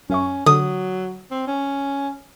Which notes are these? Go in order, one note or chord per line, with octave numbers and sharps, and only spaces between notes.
F#2 C#4 E5 C#6
D3 F#3 D#6
C4
C#4